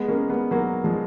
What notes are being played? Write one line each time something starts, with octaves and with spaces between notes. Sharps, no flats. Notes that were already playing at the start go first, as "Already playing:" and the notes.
Already playing: G#3 B3
A#3 C#4
G#3 B3
F#3 A#3
F3 G#3